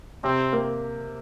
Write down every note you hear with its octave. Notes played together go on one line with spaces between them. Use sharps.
C3 C4
A#3